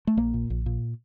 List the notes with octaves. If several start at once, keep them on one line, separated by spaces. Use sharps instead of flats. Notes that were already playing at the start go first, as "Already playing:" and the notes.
A3
A#1 A#3
A#2
A#1
A#2